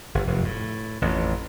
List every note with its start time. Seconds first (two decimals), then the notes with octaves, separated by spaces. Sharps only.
0.15 G1
0.27 F1 F#2
0.44 A2
1.02 A1 F2